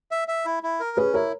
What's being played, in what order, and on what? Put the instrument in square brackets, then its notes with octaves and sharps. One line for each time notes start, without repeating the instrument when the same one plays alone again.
[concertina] E5
E5
E4
E4
A#4
[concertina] C#4 [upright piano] G#4 B4
[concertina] E4 [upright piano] A#4 C#5